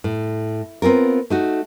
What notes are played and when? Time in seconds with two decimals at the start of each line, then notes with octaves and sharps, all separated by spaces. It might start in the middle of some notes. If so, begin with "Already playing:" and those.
0.04 A2
0.82 B3 C4 D#4 F4 A#4
1.30 A3 D#4 F#4